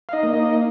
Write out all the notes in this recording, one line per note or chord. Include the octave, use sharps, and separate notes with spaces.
F5
D#4 D#5
A#3
D#4 D#5